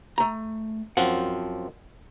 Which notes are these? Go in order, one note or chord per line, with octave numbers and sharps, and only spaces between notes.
A3 A#5
F#2 F3 C4 F#5